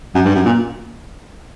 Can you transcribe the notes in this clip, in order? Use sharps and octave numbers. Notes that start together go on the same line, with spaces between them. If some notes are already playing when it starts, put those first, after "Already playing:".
F#2
G2
F#2
A#2